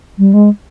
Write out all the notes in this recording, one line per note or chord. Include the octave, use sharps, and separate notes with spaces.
G3
G#3